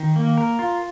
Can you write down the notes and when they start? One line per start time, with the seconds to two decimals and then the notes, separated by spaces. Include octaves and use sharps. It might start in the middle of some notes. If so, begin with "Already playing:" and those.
Already playing: D#3
0.16 A#3
0.38 A#4
0.59 F4